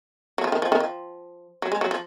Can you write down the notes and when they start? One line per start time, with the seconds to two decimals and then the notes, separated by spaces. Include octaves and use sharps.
0.38 F#3
0.44 F3
0.52 D#3
0.62 F3
0.72 D#3
0.80 F3
1.62 F#3
1.72 G#3
1.81 F#3
1.91 F3